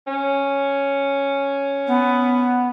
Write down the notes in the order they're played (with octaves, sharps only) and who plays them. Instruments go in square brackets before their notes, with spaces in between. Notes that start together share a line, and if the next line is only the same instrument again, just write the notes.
[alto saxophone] C#4
[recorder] B3